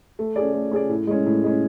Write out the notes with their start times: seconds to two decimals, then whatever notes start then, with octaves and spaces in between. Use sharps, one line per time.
0.19 A3
0.36 C#4 G#4 D5
0.54 A3
0.71 C#4 G#4 D5
0.90 A2
1.07 G#3 C#4
1.26 A2
1.44 G#3 C#4